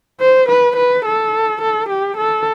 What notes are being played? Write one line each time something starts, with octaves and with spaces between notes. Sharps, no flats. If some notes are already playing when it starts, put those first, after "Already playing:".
C5
B4
B4
A4
A4
G4
A4